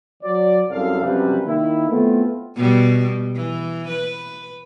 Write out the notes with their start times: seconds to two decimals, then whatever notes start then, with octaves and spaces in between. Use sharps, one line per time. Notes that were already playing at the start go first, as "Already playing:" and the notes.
0.23 F#3 D5
0.69 C2 F#2 A4 F5
1.02 F#2 C3 F3 G3 B4
1.45 D#3 A#3 E4
1.90 A3 B3 C4 E4 F4
2.56 B2 G3
3.36 E3
3.89 B4